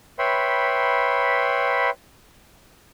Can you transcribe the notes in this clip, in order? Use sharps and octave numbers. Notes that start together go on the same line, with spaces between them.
B4 C#5 E5 G5 B5 C6